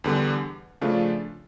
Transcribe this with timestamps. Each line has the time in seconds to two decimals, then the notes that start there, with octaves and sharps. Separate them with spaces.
0.04 E2 D3 G3
0.81 C#3 F3 A3 D4 F4